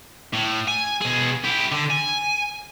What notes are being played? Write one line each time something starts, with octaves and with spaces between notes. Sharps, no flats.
A2
G#5
B2 G#4
E4 G4
D3
G#5